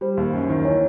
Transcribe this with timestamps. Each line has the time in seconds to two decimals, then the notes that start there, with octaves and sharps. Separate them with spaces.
0.01 G3 C5
0.17 D#2
0.33 F#2
0.49 D#3
0.65 E3 C#5